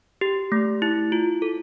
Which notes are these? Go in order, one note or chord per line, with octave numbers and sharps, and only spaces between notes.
G4
A3
E4
F4
A4